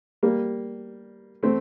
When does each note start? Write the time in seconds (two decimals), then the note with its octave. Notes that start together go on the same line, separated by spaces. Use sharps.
0.23 G3 A#3
1.43 A3 C4